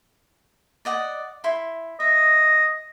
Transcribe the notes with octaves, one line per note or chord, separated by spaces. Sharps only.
D5 D#5 F#5
E4 C6
D#5 E5